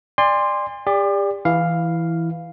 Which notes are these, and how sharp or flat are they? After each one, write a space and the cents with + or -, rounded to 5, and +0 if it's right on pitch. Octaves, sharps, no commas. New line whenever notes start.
D5 +20 G#5 -45 C6 +0
G4 +40 D5 -5
E3 +0 E4 +5 F5 +0